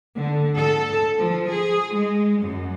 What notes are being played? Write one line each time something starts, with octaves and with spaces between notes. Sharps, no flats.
D3
A4
F3
G#4
G#3
F#2